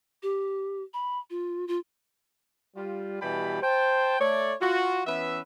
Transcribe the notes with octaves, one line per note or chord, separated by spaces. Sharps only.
G4
B5
F4
F4
G3 F4
B2 E3 G3 G4 A5 B5
C5 G5 A5
A3 C#5 D5
F4 F#4
E3 B3 C#4 B4 E5